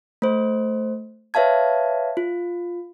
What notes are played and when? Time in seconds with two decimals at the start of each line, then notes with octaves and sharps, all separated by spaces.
0.22 A3 C5
1.34 B4 C#5 E5 F5 A5 G#6
2.17 F4